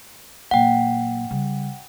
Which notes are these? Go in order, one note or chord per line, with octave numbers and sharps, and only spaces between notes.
A#2 F#3 F#5 G5
C#3 G3